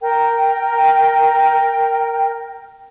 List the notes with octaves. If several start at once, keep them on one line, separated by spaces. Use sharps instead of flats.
A#4 G5